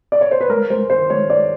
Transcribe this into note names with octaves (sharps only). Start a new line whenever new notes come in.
D5
C#5
C5
B4
G#3 A#4
G#3 C5
D#3 C5
G#3 C#5
G#3 D5